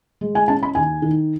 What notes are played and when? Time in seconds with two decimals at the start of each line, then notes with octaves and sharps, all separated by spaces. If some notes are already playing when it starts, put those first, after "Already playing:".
0.21 G#3
0.35 G#5
0.48 C#4 A5
0.63 B5
0.75 D#2 G#5
1.02 D#3